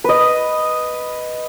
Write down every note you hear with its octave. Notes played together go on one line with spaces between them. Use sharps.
B4 D#5